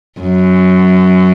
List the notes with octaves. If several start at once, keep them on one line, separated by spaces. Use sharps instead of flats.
F#2